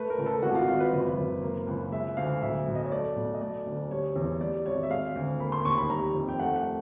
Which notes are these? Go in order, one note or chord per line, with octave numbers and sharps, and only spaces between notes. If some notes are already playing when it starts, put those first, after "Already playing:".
Already playing: A3 B4
A#4
C#2
A4
G#1 F#4
F4
G#1 F4
B4
F#1
F#1
A#3
C#2
G#3 E5
D2 F5
B1 E5
B1
D#5
C#5
A3 D5
B1
D#5
A3 D5
D2
G3 C#5
E2
G3 D5
G#1 C#5
E5
G#3 F5
D2
A#3 B5
C6
D#2 C#6
B5
G3 A#5
F2
G5
A3 F#5
F#5